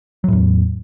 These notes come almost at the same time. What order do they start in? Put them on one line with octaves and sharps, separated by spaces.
F#3 A2 E2